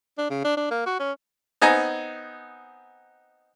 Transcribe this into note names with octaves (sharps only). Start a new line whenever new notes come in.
D4
C#3
D4
D4
A#3
F#4
C#4
B3 C4 D#4 G#5 A#5